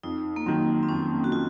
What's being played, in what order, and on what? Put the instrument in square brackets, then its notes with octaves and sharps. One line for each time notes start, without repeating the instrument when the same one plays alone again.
[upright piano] F2 [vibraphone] D#4
[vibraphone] A#3
[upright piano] D#3 F#3 [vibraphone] C4
[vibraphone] C4
[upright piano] F2 [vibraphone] C#4
[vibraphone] F#4
[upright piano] D#3 [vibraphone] F4